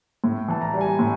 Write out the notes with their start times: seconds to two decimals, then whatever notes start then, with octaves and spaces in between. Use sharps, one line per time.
0.24 A2
0.48 E3 A5
0.61 A#5
0.74 G3
0.81 G#5
0.99 A2